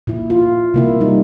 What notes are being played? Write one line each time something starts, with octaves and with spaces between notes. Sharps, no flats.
A#2 E4
E4 F4
C3 A#3 E4
G3 D#4